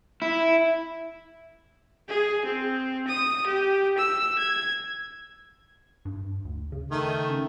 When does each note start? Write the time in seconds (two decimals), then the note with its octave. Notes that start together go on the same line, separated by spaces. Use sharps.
0.22 E4
2.09 G#4
2.45 C4
3.07 D#6
3.47 G4
3.98 E6
4.38 G#6
6.05 G2
6.45 D2
6.72 C#3
6.91 D#3 A3
7.30 C#4